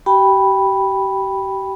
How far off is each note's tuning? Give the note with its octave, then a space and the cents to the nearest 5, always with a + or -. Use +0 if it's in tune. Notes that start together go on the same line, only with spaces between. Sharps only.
G4 -40 G5 +10 B5 -5